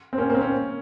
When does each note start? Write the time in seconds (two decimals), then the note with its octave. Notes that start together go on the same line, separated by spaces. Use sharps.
0.13 C4
0.18 A#3 C#4
0.30 A#3
0.35 C4
0.40 A#3 C#4